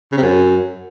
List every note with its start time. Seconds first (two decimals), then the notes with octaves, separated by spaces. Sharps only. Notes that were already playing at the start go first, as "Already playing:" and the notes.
0.12 C#3
0.17 C3
0.23 F#2